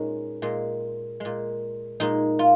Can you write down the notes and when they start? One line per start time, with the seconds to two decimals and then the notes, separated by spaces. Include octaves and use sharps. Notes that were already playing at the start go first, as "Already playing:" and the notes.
Already playing: A#2 G#3 C#4 D#4
0.42 A#2 G#3
1.20 A#2 G#3
2.00 A#2 G#3 D#4
2.39 F4